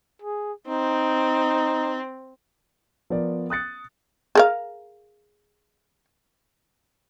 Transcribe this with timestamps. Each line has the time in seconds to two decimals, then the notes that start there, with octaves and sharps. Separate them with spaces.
0.22 G#4
0.68 C4 D#4
3.10 F3 B3 A#4 D5
3.50 D#6 F#6 A6 C#7
4.35 G#4 A#4 F5